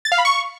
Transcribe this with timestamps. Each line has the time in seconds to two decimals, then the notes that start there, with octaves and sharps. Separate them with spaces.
0.05 A6
0.12 F5
0.18 B5
0.25 C#6